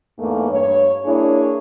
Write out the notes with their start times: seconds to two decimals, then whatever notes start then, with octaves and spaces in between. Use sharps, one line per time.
0.19 E2 G#2 A3 A#3
0.50 G2 C#5
1.05 A#3 D4 E4 G#4 C#5